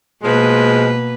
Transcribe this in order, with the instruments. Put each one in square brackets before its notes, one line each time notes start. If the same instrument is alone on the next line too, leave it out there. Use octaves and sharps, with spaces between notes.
[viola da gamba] B2 A#3 B4 [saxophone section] F3 G#3